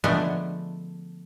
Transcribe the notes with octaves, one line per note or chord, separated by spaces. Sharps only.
D3 F3 G#3 A3 B3 D4